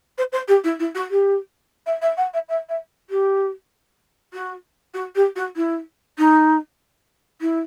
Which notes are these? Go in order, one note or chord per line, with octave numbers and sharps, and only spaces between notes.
C5
C5
G4
E4
E4
F#4
G4
E5
E5
F#5
E5
E5
E5
G4
F#4
F#4
G4
F#4
E4
D#4
E4